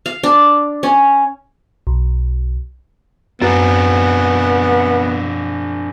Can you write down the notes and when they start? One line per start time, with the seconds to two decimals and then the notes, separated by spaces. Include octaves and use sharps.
0.06 F5
0.23 D4
0.83 C#4
1.87 B1
3.42 F#2 B3 C4 D4 G#4